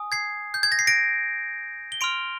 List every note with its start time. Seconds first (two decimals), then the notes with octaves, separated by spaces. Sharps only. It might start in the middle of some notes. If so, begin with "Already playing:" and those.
Already playing: G#5 D#6
0.12 G#6 C7
0.54 G6
0.63 G#6
0.72 A#6
0.79 C7
0.87 A#6 D7
1.92 G7
2.01 C6 F6 D7 F7